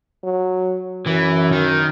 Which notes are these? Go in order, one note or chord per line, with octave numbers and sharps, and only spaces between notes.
F#3
F#2 E3
D#3